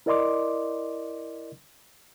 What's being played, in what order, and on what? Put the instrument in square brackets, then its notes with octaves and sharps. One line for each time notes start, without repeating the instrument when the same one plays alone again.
[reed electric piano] E4 A#4 D5 D#5 C6 D6